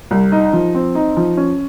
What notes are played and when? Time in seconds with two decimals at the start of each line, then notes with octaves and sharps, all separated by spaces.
0.11 C2
0.32 D#4
0.53 F3
0.75 C4
0.95 D#4
1.17 F3
1.37 C#4